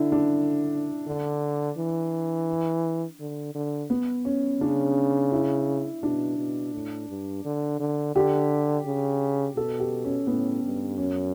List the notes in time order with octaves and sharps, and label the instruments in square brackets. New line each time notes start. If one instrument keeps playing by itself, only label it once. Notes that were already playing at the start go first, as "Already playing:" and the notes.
Already playing: [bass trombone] D3 [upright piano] D4 E4
[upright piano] D4
[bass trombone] D3
E3
D3
D3
[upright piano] B3
C#4
[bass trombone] C#3 [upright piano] D4
[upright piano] E4
[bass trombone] B2 [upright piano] D4
[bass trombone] B2
A2
G2
D3
D3
[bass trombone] D3 [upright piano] G4
[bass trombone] C#3
[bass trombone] B2 [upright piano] A4
[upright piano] G4
C#4
[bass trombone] A2 [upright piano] B3
[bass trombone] G2
[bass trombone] F#2 [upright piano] C#4